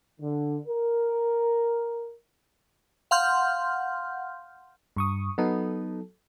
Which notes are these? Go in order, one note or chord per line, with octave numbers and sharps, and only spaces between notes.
D3
A#4
F5 F#5 C6 F6 G6
G2 C#6 D#6
F#3 B3 D#4 A4